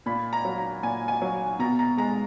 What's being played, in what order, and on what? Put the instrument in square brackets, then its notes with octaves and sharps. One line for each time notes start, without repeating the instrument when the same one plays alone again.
[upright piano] A#2 B5
A#5
F#3
A#5
A#2 G#5
G#5
F#3
B2 A#5
A#5
G#3 A#5